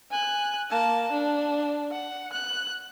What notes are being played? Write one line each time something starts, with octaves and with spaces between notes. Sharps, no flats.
G#5 F#6
A#3 A5
D4
F#5
F#6